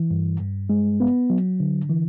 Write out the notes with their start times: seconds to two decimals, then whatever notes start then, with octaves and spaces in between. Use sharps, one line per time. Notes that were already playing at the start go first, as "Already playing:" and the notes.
Already playing: E3
0.11 G2
0.40 G2
0.70 G#3
1.00 B3
1.30 F#3
1.60 D3
1.89 E3